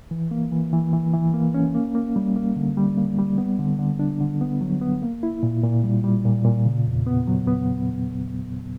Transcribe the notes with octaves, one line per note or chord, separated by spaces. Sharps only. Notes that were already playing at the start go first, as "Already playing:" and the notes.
E3
A#3
E3
E3
E3
E3
A#3
C#4
A#3
A#3
G3
A#3
D3
G3
A#3
G3
B3
D3
D3
D4
D3
B3
F#3
B3
A#3
E4
A#2
A#2
G3
G3
A#2
A#2
C#3
E2
B3
F#3
B3